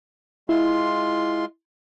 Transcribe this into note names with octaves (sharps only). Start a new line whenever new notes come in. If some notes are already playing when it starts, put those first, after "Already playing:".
G#3 E4 F4 C6